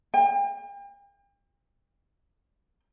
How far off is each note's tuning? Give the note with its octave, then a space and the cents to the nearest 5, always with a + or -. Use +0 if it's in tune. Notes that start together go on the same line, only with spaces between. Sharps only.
G5 +40